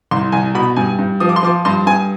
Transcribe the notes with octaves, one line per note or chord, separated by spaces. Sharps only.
C2 C6
C2 G#5
B2 B5
G2 G#5
G2
F3 D#6
D6
C6
F3 D6
G2 C6
G2 G#5